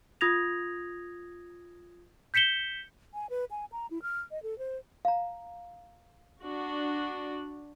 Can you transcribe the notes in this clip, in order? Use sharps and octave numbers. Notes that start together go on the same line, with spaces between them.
F4 D#6 G#6 A#6 F7
G6 B6 C#7 E7 G7
G#5
B4
G#5
A#5
E4
F6
D#5
A4
C5
F5 A#5
D4 F#4